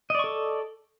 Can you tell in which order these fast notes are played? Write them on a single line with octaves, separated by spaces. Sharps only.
D#5 D5 C#6 A4